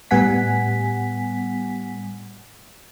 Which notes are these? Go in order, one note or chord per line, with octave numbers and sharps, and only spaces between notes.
A2 G3 B3 F#5 G#5 B6